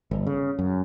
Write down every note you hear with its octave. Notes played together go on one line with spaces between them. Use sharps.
G1
C#3
F#2